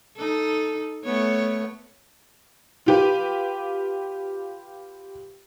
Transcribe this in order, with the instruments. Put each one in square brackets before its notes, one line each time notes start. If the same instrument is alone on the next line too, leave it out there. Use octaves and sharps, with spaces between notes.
[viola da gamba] D#4 A4
A3 B3 C#5
[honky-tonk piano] F4 G4 B4